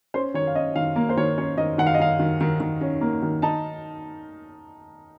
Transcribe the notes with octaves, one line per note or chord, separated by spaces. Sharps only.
C#4 C5
D#3 C#5
F5
C#4 D#5
D#3 F5
A#3
C5
D#3 C#5
C#4 C#5
D#3 D#5
D#3 F#5
F5
D#5
D#3 F5
D#3
D#3
D#3
C#4
A#3
D#3
D#4 A5